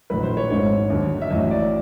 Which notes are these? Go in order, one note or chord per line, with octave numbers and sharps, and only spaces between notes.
A#1 A2 F#3 B4
C5
C#5
G#1 G#2 D#3 C#5
D#2 D3 F#3
E5
A1 A2 F#3 D#5
D5